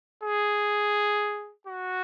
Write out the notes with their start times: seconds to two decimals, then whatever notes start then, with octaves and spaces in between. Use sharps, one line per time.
0.23 G#4
1.67 F#4